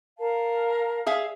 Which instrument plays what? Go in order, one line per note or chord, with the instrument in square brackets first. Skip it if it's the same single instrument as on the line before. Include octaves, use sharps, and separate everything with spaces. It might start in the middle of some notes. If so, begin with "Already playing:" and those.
[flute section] A#4 F5 A5
[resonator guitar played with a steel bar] G#4 E5 F5